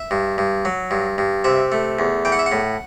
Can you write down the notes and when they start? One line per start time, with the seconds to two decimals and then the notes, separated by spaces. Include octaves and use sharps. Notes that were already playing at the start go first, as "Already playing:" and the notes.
Already playing: E5
0.11 G2
0.38 G2
0.65 F#3
0.91 G2
1.18 G2
1.44 C3 E5
1.72 A3
1.99 E2
2.25 E3 G5
2.32 F#5
2.39 E5
2.46 F#5
2.52 A2